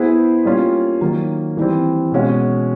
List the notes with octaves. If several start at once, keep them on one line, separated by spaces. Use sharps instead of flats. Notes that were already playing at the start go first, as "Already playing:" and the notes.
Already playing: B3 E4 G#4 C5
G3 A#3 C#4 F4
D#3 F#3 A#3
E3 G3 C4
B2 G#3 C#4 F#4